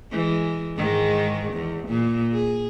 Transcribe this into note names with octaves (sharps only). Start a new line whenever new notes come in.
E3 G#3
G#2 D#3 G#3
E2
A#2
G#4